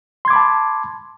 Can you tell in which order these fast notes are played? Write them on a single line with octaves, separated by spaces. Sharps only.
C6 G#6 D6 B5 A5